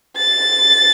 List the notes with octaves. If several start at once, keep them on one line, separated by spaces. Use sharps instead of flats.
A6